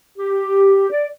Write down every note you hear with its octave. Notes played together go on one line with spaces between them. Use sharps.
G4
D5